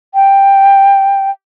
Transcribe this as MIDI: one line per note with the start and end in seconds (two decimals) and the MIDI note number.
0.15 1.31 79